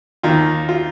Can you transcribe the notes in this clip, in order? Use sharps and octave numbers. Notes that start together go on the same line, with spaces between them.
D#2 D#3 F4
F4